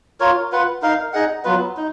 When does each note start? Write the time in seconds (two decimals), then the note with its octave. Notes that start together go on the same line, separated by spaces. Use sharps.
0.20 F4 A#4 C#5
0.52 F4 B4 F#5
0.82 D#4 A#4 F5
1.13 D#4 G#4 D#5 F#5
1.44 F#3 B3 F4 B4
1.77 D#4